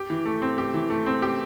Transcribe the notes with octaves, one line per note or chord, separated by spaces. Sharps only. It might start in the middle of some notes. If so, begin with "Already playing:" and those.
Already playing: G4
E3
A3
C4
G4
E3
A3
C4
G4